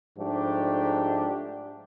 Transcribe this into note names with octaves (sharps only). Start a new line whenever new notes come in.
G#2 F3 A3 D4 G4